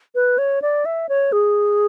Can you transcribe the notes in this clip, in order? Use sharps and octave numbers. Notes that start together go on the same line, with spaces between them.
B4
C#5
D5
E5
C#5
G#4